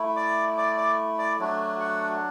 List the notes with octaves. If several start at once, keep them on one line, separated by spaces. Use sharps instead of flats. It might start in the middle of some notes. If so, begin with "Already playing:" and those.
Already playing: A3 E4
D5 D6
D5 D6
D5 D6
D5 D6
F#3 A3 D4 F#4
F#4 F#5